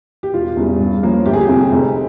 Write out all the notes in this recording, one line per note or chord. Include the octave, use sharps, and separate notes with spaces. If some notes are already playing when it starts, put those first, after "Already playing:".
G4
E1 F4
E2 C#3 G3
G2
F3 A#3 C#4
G1 G4
G#4
G4
F2 C3
F1